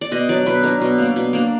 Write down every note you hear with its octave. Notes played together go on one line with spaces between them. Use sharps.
D5
B2 D#5
F#3 D4 D5
B2 B4
F#3 D4 A#4
B2
A#3 D4
B2
A#3 D4